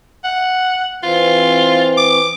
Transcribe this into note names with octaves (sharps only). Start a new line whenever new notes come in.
F#5
E3 C4 F4
D6